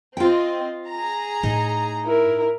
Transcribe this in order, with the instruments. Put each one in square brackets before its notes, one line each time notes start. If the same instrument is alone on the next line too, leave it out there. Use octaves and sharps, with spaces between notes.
[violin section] C4 D#5 [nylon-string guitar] F4 G5
[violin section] G#4 A#5
[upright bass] A2 [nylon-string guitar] D#4
[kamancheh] E4 A#4